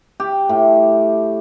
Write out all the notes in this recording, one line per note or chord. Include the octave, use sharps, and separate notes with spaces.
G4
A2